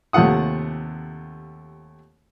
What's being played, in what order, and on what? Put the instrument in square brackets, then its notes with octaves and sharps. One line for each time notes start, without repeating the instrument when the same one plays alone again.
[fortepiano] D#2 C3 A3 F4 F#5 D#6